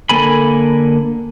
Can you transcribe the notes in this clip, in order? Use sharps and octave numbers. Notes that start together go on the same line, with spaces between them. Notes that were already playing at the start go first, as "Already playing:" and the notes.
D3 A#3 A4 G#5 B5